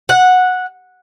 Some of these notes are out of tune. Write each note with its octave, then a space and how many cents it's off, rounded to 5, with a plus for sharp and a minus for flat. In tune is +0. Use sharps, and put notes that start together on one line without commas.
F#5 -10